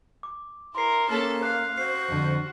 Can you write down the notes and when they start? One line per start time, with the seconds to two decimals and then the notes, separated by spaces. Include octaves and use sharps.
0.23 D6
0.75 E4 A#4 C6 C7
1.09 A#3 C#4 A4 F6 B6
1.43 F5 F#6 C7
1.78 F#4 C5 C7
2.08 F2 D3